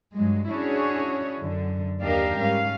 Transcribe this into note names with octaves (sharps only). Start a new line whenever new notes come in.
G2 F#3 G#3
C#4 D4 E4 F#4 G#4 C#5
F#2 D3
D#2 D4 D#4 G4 A#4 F5
G#2 G3 C#4 F5